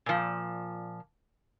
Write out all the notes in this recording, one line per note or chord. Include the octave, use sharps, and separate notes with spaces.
A#2 F3